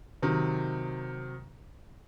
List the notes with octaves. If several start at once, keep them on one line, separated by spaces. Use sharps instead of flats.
C3 D#3 F#3